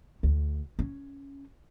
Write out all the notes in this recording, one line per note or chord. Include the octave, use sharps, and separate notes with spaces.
D2
C#4